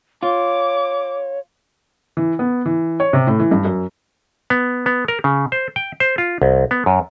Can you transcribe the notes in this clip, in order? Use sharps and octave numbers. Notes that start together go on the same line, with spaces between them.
F4 C#5 D6
E3
B3
E3
C#5
C3
A2
E3
G2
F#2
B3
B3
A#4
C#3
C5
G5
C5
F4
C2
B3
F#2